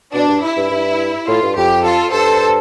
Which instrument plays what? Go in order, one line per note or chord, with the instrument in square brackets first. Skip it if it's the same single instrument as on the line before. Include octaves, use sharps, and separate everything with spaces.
[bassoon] B2 [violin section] D4
[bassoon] G2
[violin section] E4
[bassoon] G2
G2
[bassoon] A2 [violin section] F4
[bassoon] G2
[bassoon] F2 [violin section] G4
[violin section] F4 A4
[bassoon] G2 [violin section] A4 C5